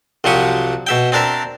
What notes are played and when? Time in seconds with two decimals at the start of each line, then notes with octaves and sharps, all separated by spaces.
0.24 C2 F3 F#3 G4 C#6 D#6
0.87 B2 E5 G5
1.12 C4 D4 A#4 E5